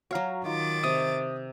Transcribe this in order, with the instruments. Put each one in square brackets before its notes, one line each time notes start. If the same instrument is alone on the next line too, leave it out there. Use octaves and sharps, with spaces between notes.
[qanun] F#3 C#5 [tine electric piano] F#4 F5 A#5
[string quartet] D#3 D6 A6 [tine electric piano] D#4 F4
[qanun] C3 [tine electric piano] D#6